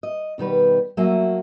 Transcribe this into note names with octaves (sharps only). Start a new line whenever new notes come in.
D#5
B2 D#3 G3 B4
F#3 A3 A#3 F#4 E5 G#5